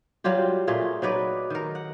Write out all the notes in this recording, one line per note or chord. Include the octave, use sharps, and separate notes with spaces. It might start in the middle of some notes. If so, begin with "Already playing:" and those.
F#3 G3 F4 G4
A#2 A3 F4 G#4
F#3 D#4 B4 D5
D#3 A#4
F#5